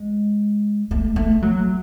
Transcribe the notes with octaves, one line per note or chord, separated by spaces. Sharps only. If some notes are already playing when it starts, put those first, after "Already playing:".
Already playing: G#3
A3
A3
F#3